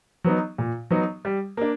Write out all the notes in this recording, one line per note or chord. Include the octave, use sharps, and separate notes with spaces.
F#3 B3 D#4
A#2
F#3 B3 D#4
G3
A#3 D4